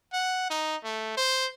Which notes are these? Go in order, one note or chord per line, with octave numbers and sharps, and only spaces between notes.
F#5
D#4
A3
C5